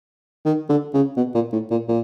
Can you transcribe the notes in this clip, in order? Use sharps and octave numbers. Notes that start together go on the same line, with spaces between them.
D#3
D3
C#3
B2
A#2
A2
A#2
A#2